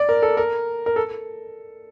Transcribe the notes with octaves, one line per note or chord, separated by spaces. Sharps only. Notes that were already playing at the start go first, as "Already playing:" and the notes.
Already playing: D5
A#4
A4
A#4
A#4
A4